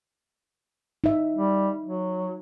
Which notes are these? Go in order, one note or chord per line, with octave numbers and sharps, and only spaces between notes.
D#4 E5
G3
F#3